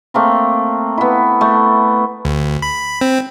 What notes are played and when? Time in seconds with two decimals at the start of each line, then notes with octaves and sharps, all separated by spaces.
0.14 A3 A#3 C4
0.98 B3 E4
1.41 A3
2.25 D2
2.62 B5
3.01 C4